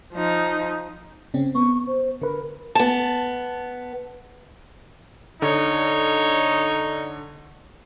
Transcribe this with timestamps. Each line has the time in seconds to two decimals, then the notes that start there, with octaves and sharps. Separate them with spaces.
0.14 F3 D#4
1.34 C#3 C4 C#4
1.55 B3 C#6
1.87 C5
2.22 D3 A#4 B4
2.75 B3 A5
5.42 D3 D#4 C#5